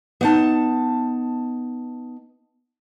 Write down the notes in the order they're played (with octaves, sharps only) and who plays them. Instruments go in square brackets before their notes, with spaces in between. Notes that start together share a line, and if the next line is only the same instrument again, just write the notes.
[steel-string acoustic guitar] B3 D#4 A5